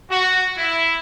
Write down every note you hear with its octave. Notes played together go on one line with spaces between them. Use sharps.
F#4
E4